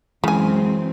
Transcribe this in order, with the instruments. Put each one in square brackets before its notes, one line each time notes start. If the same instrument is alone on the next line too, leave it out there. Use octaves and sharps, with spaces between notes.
[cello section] F#2 F#3 C4 [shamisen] C#3 G#5 [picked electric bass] E3 [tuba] G#3